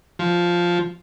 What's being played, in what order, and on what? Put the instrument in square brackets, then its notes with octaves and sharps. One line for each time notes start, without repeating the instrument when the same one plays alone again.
[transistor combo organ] F3